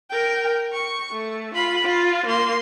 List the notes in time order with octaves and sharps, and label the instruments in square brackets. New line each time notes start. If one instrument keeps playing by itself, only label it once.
[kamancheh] A#4 G5
C#6
A3
F4 B5
F4
A#3 C6